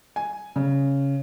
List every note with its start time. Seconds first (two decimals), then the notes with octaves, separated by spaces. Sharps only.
0.16 G#5
0.56 C#3